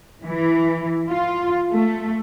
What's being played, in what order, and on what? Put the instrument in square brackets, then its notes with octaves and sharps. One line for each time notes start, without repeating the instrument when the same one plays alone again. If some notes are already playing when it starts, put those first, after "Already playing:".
[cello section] E3
F4
A3